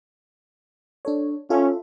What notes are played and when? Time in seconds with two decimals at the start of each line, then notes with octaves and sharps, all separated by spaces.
1.05 D4 A4 C#5
1.50 C#4 F4 A4 E5